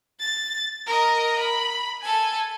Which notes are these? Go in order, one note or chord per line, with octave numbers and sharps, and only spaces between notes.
A6
A#4 D#5
B5
A4 G#5